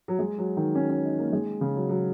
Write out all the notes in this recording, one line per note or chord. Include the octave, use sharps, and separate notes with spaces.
F#3
G#3
F#3
D#3
C#4
C#4
D#4
A#3
G#3
C#3
F#3
F#3